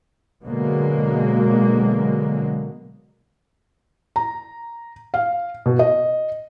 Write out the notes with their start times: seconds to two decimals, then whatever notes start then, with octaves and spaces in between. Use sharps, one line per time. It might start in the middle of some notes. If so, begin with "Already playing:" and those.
0.44 B2 D3 F#3 G#3 A#3
4.16 A#5
5.14 F5
5.66 B2
5.79 D#5